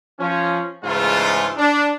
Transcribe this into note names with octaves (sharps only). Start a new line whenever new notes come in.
F3 C#4
G#2 C#3 E3 G#3 A3 F4
D4